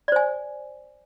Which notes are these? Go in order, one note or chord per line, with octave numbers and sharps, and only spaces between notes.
C5 D5 G#5